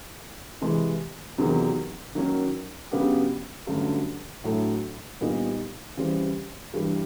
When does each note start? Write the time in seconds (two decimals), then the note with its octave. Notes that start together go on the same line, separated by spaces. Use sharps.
0.61 C3 E3 G#3
1.38 E2 C3 D#3 F#3
2.15 D#3 F#3 A#3 C#4
2.91 C#3 F#3 B3 D4 G4
3.67 G2 D3 F#3 A3 C#4
4.44 A2 F#3 A3 D4
5.21 A#2 G3 B3 D#4
5.97 C#3 E3 G3 C4
6.74 G2 E3 G3